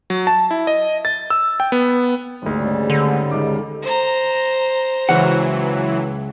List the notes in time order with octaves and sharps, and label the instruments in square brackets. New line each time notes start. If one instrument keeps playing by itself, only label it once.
[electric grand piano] F#3
A5
E4
D#5
A6
E6
G5
B3
[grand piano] G#1 D2 [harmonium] G#2
[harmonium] G#2 C#3 G3
[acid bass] D3
[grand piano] C#2 D#3 D6
[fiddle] C5 A#5
[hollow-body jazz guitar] C#2 F#5 [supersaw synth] E3 F#3